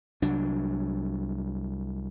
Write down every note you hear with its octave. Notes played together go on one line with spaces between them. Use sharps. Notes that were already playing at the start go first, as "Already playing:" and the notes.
C2 F#3 D4